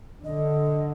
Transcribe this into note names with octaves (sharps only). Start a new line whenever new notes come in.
D3 D#5